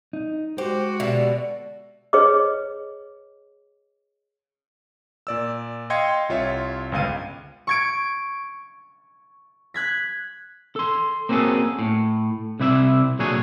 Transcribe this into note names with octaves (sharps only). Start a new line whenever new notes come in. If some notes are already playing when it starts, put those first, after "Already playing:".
D#4
G#3 F#4 G4 C5
B2 D3 G4 E5
G#4 B4 C#5 D#5 D6
A#2 D5 E6
D#5 F5 G5 C6 G#6 C#7
C2 F4 C#5 E5
G1 C#2 F5 D#7
C#6 G#6 D7
F#6 G#6 B6
A4 C6
A#3 C4 C#4 F#4 G#4 A4
A2
C2 C3 E4 D5 E5
A#2 D3 F#3 D4 G#4 C#5